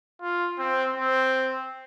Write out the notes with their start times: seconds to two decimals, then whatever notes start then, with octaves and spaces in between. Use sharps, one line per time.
0.22 F4
0.59 C4
0.96 C4